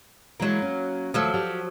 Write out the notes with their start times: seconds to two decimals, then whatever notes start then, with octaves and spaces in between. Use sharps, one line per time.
0.40 E3 F#3 G#3 A#3 E4
0.62 C#4
1.14 D#2 F3 F#3 A3 A4 E5
1.34 F#4 G4 D5